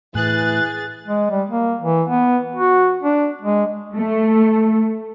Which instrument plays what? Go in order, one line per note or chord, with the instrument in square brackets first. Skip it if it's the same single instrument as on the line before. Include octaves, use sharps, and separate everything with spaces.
[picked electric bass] A2 [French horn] E3 [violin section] G#4 A6 [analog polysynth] F#6
[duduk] G#3
G3
A#3
E3
B3
F#4
D4
G#3
[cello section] A3